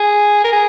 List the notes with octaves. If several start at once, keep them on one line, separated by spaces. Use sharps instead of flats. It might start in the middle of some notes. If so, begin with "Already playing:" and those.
Already playing: G#4
A#4
G#4